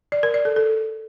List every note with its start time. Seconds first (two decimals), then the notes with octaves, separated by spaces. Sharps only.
0.12 D5
0.23 A#4
0.34 D5
0.45 A4
0.56 A4